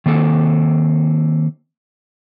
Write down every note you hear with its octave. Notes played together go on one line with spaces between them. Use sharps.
D#3 A#3 C4 A4